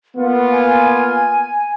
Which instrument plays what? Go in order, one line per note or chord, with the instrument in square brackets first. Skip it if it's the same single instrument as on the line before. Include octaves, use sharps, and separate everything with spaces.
[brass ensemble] A#3 B3 F4 [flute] F#5
[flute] G#5